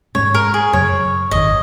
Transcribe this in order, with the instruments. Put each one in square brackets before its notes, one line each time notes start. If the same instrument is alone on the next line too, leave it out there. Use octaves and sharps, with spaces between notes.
[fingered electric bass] G#2 G#3 C#4 [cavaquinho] C#5
[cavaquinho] A#4
G#4
[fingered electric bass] F#2 C#3 F#3 [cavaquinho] C#5
[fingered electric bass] G#1 F#2 D#3 [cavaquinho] D#5